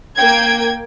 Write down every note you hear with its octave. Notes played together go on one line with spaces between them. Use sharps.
A#3 G5 G#6